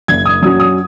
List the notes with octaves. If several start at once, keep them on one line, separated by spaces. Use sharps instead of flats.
F#1 G#6
D#6
F#2 F#3 C#4 D#6
D#6